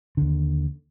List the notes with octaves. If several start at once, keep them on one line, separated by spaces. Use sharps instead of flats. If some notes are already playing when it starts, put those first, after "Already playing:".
D#2 D3